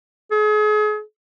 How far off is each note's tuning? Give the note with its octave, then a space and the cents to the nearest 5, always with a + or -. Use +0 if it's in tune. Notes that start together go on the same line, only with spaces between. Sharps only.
G#4 +35